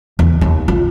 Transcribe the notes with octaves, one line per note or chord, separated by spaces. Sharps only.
E2
D#2
F4